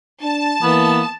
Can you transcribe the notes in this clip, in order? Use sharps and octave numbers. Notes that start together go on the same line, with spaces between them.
D4 A5
E3 A#3 B3